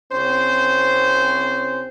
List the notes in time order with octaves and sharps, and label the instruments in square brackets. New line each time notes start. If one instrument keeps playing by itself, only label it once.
[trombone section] C2 C4 C#4 C5